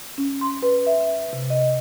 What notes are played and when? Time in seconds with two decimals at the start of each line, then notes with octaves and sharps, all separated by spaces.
0.18 C#4
0.41 C6
0.62 B4
0.87 E5
1.33 C3
1.50 D#5